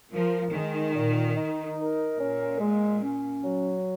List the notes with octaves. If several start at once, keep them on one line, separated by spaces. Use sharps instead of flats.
F3 A#4
D#3 G#3
A#2
D#4
A#4
A#2 C#4
G#3
C#4
F#3